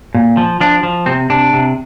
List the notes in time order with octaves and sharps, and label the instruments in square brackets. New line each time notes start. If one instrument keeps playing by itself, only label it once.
[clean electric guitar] A#2
F3
F3 D4
F3
C3 C4
C3 D4
C3